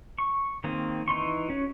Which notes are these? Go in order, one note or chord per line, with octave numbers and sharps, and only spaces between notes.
C#6
D#3 A#3 C4 G#4
E3 D#4 C6 C#6
C#4 F#4